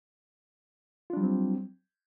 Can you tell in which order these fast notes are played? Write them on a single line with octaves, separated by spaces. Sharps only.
F4 D4 G3 F#3 C4